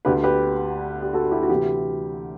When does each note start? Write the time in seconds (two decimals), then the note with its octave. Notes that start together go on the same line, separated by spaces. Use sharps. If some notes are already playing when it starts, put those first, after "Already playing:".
0.05 D2 D3 G4 B4
0.24 G4 B4
1.02 G4
1.13 F#4 A4
1.31 E4 G4
1.43 F#4
1.49 D2 C3 E3 E4 G4